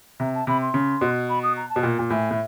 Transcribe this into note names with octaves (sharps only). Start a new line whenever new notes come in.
C3 A#5
A5
C3 B5
C6
C#3
B2
B5
D#6
A#5
A5
B2
A#2
A#2
A2 G#5
A2